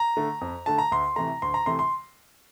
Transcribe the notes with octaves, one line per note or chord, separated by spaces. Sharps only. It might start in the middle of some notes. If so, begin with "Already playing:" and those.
Already playing: A#5
D3 A3
F2
D3 A3 A5
A#5
D2 C6
C3 E3 A3 A#5
D2 C6
A#5
C3 E3 A3 C6
C6